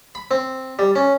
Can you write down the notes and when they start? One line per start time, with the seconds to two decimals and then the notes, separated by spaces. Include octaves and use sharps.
0.15 B5
0.31 C4
0.79 G3
0.96 C#4